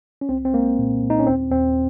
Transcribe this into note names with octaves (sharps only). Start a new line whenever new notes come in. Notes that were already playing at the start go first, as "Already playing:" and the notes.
C#4
C2 C4
C4
G#3 A#3
A#2
A#2
D#4
C#4
D#2 C4
D#2 C4